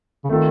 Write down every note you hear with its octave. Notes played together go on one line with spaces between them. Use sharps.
C#3
D#3 A3 C4 F4 A4